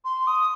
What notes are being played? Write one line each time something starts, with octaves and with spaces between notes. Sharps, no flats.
C6
D#6